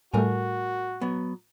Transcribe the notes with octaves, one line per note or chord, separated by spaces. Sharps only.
A2 G3 A3 F#4 A#4 G#5
F#3 B3